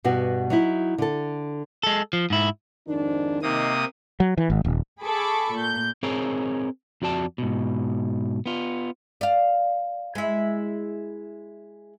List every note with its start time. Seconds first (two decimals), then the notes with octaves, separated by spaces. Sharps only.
0.04 G2 B2 B3 F#4 G4
0.50 F#3 D#4 E4
0.98 D3 A4
1.83 G#3 A4
2.13 F3
2.30 G#2 E4
2.87 F2 G#2 D#3 D4
3.42 C3 A#3 D#4 D#6
4.20 F#3
4.38 E3
4.50 G#1
4.65 D#1
5.02 G#4 A4 B5 C#6 D6
5.55 A#2 G6
6.03 C4 G#4 A#4 C#5
7.02 F2 F#4 D5 A5
7.38 G#2 B2
8.46 B3 F4
9.21 D5 F5
10.15 G#3 E4